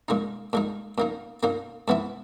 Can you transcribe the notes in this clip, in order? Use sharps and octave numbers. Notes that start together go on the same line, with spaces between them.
A#2 G#3 D#4
A#2 G#3 D#4
A#2 A#3 D#4
A#2 A#3 D#4
G#2 E3 B3 E4